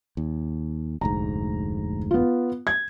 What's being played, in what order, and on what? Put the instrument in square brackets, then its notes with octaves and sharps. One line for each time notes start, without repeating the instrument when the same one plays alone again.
[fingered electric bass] D#2
[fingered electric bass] F1 D2 G#2 [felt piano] A#5
[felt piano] B3 F4
G#6